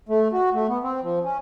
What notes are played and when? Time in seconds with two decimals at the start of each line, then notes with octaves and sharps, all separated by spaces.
0.09 A3
0.33 F#4
0.53 A3
0.68 B3
0.83 C4
1.02 F3
1.24 C#4